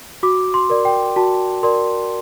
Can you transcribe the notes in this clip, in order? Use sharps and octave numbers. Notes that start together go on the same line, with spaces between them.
F#4 D6
C6
A#4 D5
G5
F#4 A5
A#4 D5 C6